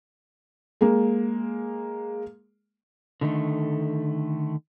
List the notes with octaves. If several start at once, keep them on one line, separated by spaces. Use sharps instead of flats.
G#3 A#3
D3 D#3 A3